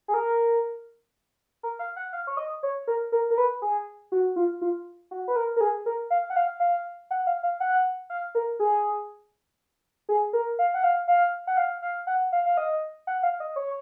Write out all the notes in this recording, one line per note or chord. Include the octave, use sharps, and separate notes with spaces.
G#4
A#4
A#4
F5
F#5
F5
C#5
D#5
C#5
A#4
A#4
A#4
B4
G#4
F#4
F4
F4
F#4
B4
A#4
A#4
G#4
A#4
F5
F#5
F5
F5
F#5
F5
F5
F#5
F5
A#4
G#4
G#4
A#4
F5
F#5
F5
F5
F#5
F5
F5
F#5
F5
F5
D#5
F#5
F5
D#5
C#5